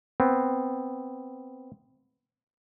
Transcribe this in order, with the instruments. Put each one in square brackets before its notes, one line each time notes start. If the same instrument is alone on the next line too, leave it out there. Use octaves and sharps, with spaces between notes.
[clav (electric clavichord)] B3 C4